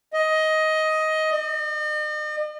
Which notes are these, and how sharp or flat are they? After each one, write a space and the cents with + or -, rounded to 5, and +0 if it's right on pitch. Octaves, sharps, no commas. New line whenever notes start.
D#5 +15
D#5 -45